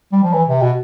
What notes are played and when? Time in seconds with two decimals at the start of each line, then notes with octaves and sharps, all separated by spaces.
0.12 G3
0.23 F3
0.33 E3
0.48 C3
0.61 B2